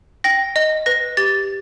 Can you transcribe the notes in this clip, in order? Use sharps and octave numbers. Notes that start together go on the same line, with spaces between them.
G5 A#6
D#5
B4 A#6
G4 A6